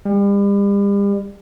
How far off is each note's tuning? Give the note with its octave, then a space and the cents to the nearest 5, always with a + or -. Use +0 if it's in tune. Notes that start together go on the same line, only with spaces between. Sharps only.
G3 +40